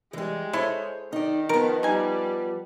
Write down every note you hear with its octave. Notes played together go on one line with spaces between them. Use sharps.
E3 G3 G#3
E4 A4 C5 C#5
D#3 D#4 D5
F3 B3 A#4
G3 D#4 G#5